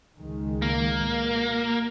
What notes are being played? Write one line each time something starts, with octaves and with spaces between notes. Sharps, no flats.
C#2 D#3 G#3
A#3
B2